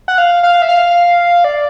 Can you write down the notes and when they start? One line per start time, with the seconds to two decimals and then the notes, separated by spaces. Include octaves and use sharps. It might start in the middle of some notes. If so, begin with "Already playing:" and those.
0.08 F#5
0.18 F5
0.43 F5
0.62 E5
0.69 F5
1.44 D5